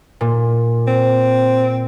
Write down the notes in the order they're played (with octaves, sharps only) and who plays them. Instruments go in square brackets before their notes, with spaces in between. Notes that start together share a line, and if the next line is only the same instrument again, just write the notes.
[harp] A#2
[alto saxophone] C4